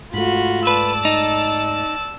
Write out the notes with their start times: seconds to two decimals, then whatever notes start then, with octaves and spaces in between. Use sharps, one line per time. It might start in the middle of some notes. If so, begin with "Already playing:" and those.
0.14 G#2 A3 F4 F#4 B5
0.67 B4 D5 A5 E6
1.05 D#4